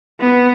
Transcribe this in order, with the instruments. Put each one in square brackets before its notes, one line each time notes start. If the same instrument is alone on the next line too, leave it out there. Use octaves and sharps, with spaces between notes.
[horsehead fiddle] B3